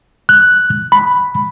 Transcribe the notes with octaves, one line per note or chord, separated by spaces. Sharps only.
F#6
B5